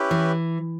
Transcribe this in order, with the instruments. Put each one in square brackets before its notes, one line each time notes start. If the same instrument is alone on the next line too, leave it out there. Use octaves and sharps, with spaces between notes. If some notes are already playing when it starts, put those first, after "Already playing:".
Already playing: [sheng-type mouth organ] C#4 E4 G4 B4
[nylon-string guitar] E3